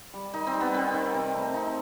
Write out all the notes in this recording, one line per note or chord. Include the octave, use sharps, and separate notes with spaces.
G3
D#3 D#4
C4
G3
B3
D#3 C4
D#3
C3
A3
C3 D#4